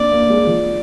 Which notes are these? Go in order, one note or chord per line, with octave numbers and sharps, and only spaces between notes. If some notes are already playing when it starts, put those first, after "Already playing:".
Already playing: A#3 D4 D5
A#3
G#3
F3